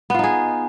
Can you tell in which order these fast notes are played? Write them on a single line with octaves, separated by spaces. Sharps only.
B3 F4 D#4 G#4